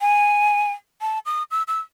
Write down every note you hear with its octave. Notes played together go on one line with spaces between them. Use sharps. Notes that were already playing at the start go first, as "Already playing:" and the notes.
G#5
A5
D#6
E6
E6